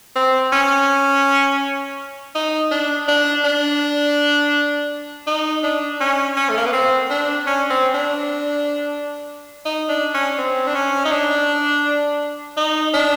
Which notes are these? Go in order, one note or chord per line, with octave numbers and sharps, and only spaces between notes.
C4
C#4
D#4
D4
D4
D4
D#4
D4
C#4
C#4
A3
A#3
B3
C4
D4
C#4
C4
D4
D#4
D4
C#4
C4
D4
C#4
D#4
D4
D#4
D4